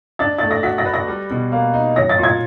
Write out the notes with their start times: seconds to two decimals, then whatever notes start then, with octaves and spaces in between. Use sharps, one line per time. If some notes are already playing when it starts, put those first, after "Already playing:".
0.19 D4 A6
0.38 A3 A6
0.51 A#6
0.63 F#4 B6
0.78 A#6
0.85 B4
0.94 A#6
1.08 G3
1.30 B2
1.52 A#3
1.74 D#4
1.96 F#3 A#6
2.09 A6
2.18 A#2
2.23 G#6